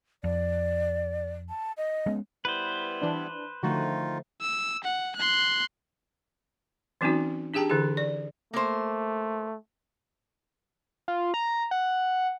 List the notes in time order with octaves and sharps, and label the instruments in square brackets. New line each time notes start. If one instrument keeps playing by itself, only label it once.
[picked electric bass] F2 [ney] D5
[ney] A5
D#5
[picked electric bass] G#3 B3 C#4
[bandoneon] G3 B3 E4 [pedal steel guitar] B4 C5
[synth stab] E3 D4
[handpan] D3 F3 A3 [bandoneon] D#3 D#4 F4 [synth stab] F#4
[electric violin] E6
F#5
C6 F#6
[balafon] E3 F#3 C4 C#4 D#4 F#4
D4 G4 G#4 G5 A5 A#5
D3 E3 E4 G#4
D5
[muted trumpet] A3 [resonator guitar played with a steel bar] A#3 C5
[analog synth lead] F4
A#5
F#5